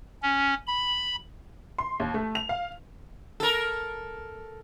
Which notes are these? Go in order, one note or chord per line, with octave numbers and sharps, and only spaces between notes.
C#4
B5
C6
D#2
A3
F7
F5
A4 A#4